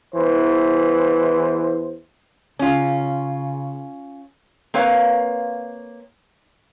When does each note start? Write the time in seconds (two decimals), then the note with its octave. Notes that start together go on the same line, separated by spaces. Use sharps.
0.15 E2 E3 C5
2.59 C#3 C#4 F4
4.74 A#3 C4 B4 C#5 F5